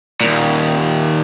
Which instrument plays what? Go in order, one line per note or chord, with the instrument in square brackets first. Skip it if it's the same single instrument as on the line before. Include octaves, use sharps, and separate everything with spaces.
[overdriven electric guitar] D#2 A#2